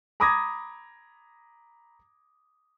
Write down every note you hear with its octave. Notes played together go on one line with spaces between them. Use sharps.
A#5 B5 D6 D#6 G#6 A#6